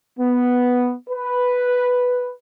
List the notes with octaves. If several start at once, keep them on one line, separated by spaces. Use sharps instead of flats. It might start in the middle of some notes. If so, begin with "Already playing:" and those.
B3
B4